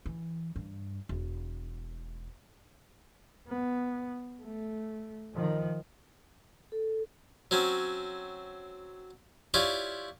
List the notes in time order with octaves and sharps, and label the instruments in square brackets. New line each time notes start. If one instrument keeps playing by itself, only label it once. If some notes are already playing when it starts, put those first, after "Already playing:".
[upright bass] E3
G2
E1
[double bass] B3
A3
D#3 F3
[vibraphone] A4
[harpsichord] F#3 C4 C#4
E4 F4 G4 C#5 D5